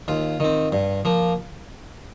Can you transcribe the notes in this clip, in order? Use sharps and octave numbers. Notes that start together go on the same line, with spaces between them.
D#2 F4
D#3 C4
G2
F3 A#3